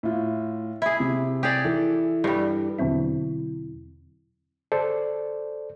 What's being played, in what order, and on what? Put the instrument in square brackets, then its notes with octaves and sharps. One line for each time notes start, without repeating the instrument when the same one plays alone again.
[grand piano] A2 F4
[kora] E4 G#4
[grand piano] C3
[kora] G4 G#4 D5
[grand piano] E3 A4
[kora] G2 G3
[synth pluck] E2 B2 D3 F#3 C4 E4
[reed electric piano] A4 C5 D5